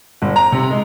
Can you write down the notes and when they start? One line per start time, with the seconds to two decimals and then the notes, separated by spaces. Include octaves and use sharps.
0.22 G1
0.36 A#5
0.52 C3
0.70 G#3